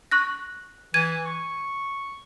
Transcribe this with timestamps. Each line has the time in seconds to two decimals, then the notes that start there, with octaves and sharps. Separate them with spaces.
0.11 C#6 F#6 A#6
0.94 E3 G#6 D#7
1.26 C#6